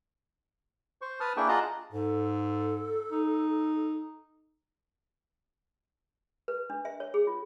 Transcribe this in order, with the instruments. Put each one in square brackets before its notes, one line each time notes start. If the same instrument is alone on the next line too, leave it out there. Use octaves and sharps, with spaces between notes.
[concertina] C5 C#6
B4 A5 D#6 F6
A#3 D4 E4 G#4 G5 C#6
F4 G#4 D#5 F#5 A5 A#5
[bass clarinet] G#2 [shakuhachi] A4
[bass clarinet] D#4
[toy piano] B4
D4
E5
C#5
G#4
F4